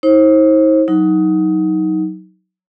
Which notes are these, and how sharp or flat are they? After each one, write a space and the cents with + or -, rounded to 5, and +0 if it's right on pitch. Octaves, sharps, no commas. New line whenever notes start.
D#4 +45 C5 +30
F#3 +0 D#4 +20